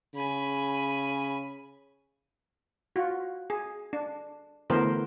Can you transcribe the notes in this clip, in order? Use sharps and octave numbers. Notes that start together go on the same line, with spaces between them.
C#3 G#5 B5
F4 F#4
G#4
D4
D3 E3 A3 B3 A#4 C5